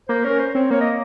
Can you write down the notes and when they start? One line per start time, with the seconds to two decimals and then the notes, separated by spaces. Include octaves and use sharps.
0.09 A#3 C5
0.24 C#4 A#4
0.40 C5
0.55 C4 C#5
0.70 A#3 C#5
0.81 D#5